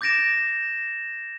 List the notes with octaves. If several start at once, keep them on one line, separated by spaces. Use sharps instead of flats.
D6 G6 A6 A#6 D7 E7